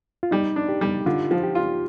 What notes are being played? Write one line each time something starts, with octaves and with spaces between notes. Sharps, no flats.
F4
G3 D#4
D4
G4
G3
D3 F4
F3
G4
F4